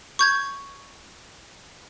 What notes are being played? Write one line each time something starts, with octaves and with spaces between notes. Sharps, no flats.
C#6 G6 G#6